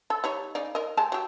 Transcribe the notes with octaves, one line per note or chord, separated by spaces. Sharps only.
A4
G3 D#4 C#5
C#3 D#4 D5
A#4 D#5
G#3 G4 A5
F#3 G4